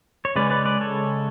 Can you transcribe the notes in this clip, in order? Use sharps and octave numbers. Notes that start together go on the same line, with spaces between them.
C#5
C#3 G#3 C#4 B4 D5
B4 D5
B4 D5
A4 C#5